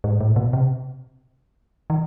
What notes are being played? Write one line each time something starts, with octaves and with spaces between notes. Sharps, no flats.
G#2
A2
A#2
B2
C3
D#3